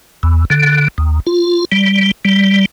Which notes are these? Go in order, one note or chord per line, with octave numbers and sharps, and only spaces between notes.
E2
D3
D#2
F4
G3
G3